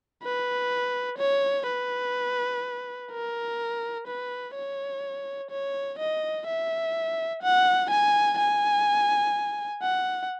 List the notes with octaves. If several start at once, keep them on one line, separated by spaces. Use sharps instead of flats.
B4
C#5
B4
A#4
B4
C#5
C#5
D#5
E5
F#5
G#5
G#5
F#5